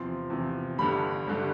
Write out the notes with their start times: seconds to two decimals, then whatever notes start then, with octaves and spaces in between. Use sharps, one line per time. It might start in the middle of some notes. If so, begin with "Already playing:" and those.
Already playing: E2 C3 F3 C6
0.30 E2 C3 F3
0.78 G1 G2 D3 G3 B5
1.27 G1 G2 D3 G3